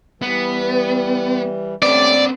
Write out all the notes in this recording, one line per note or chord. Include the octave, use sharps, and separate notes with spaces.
E3 G3 B3
A3 C4 C#4 G4 B4 D5